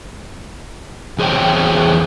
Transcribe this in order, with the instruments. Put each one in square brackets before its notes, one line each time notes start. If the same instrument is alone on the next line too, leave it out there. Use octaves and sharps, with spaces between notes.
[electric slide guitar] E2 G#4 C5 C#5 G5